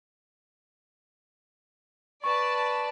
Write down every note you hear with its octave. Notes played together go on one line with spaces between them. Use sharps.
B4 D5 A5 C#6